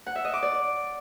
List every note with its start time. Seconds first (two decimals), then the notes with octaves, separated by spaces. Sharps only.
0.06 F#5
0.16 E5
0.25 D#5
0.34 D6
0.43 D5